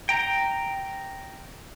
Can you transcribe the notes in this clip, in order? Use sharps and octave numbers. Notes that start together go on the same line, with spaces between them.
G5 A#5